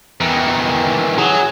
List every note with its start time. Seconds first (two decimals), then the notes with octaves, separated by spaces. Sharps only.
0.20 E2 D#3 E3
1.18 F#3 G#4